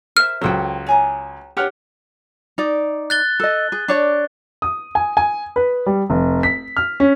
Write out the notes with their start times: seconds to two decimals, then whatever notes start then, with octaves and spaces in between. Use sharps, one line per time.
0.17 A#4 C5 E5 F6
0.41 C#2 F#3 A4 C5 G5
0.86 C#5 G#5 A#5
1.57 D4 G4 B4 C#5 F#5 F6
2.58 D#4 D5
3.10 F#6 A6 G7
3.40 A4 D#5
3.72 G#4
3.88 D4 C#5 D5
4.62 D#6
4.95 G#5
5.17 G#5
5.56 B4
5.86 G3
6.10 F1
6.43 B6
6.77 F6
7.00 C#4